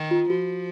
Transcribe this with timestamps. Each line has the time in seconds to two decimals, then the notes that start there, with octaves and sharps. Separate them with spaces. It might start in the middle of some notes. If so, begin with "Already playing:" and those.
Already playing: D#3
0.11 F4
0.29 F3 F#4